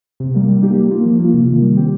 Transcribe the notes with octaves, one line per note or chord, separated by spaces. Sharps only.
C3
G3 A#3
G3
A#3 D#4 G4
G3
A#3 F4
F3
A#3 F4
C3
D#3 A#3
G3
C4 G4